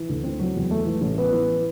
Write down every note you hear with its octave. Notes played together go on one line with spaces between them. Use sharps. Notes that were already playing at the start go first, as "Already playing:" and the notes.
Already playing: E3
D2
C4
F#3
E2
A3
E3
A1
B3
E3